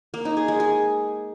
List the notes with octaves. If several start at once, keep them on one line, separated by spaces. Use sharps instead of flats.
A#3
D#4
G#4
G#3
G#4